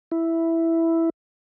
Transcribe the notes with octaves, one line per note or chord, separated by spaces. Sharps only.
E4